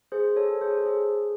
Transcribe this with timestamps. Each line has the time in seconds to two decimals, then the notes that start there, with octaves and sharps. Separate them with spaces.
0.12 G#4 C5
0.36 A4 C#5
0.61 G#4 C5
0.77 A4
0.86 G#4